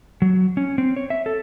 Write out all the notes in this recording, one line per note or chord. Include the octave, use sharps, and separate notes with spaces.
F#3
C#4
C4
C#5
E5
A4